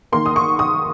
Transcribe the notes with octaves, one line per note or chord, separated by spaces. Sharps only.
D#3 A#3 C6
D#6
C#6
D#6